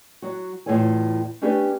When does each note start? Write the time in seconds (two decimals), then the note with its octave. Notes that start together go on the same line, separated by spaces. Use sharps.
0.22 F#3 F#4
0.66 E2 A2 F4 A4 C#5 G#5
1.42 A3 B3 C#4 D4 G4 B4